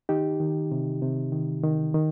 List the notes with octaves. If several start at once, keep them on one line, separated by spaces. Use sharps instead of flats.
D#3 D#4 G4
D#3
C3
C3
D#3
D#3
D#3